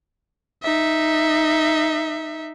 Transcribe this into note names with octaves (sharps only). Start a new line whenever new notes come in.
D#4 E5